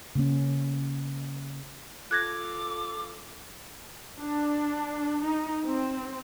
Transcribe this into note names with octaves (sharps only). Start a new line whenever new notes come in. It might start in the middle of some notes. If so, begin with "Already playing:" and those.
C#3 A#3 C#4
F4 A4 D6 F#6 G#6 A#6
D4
D#4
C4